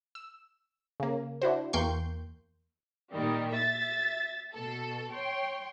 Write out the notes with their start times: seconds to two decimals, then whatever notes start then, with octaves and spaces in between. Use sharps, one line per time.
0.15 E6
1.00 C#3 A#3
1.42 D4 E4 F#4 C5
1.73 E2 A#3 G5 C6 C#6 G6
3.12 A#2 D#3 G3
3.52 E5 A6
4.53 B2 A4
5.11 C#5 G5 C6